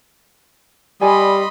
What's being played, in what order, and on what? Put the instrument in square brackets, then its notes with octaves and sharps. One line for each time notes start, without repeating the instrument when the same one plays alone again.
[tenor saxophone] G3 [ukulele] G4 D5 G#5 [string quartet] D#5 B5 C6